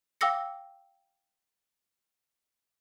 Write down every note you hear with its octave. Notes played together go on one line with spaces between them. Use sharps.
F5 G5 D6 E6 A#6 C#7